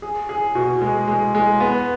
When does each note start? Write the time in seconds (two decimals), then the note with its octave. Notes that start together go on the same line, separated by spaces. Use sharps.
0.02 G#4
0.29 G#4
0.55 B2
0.81 G#3
1.08 G#3
1.35 G#3
1.60 B3